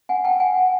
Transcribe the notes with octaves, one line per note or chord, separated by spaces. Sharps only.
F#5 G#5
G5 A5
F#5 G#5